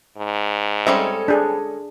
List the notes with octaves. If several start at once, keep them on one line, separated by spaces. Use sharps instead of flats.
G#2
G3 G#3 C4 C#4 A4 E5
D4 G#4